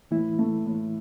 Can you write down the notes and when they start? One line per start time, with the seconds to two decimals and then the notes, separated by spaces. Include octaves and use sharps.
0.11 A2 E3 E4
0.39 A3
0.66 A2